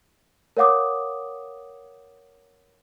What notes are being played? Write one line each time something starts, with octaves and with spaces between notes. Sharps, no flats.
A#4 C#5 F5 F#5 D6 D#6